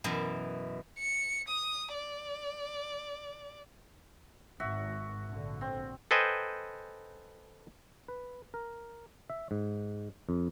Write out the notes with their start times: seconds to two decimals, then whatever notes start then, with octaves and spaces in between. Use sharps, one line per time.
0.04 F#2 B2 E3
0.99 C#7
1.48 D#6
1.94 D5
4.60 G#1 F#4 E5
5.28 A#1 D3
5.61 C4
6.11 A4 B4 C5 D#5 G5 G#5
8.08 B4
8.54 A#4
9.30 E5
9.51 G#2
10.29 F2